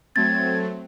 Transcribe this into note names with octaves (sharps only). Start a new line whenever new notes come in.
F#3 A3 C4 G#6 A6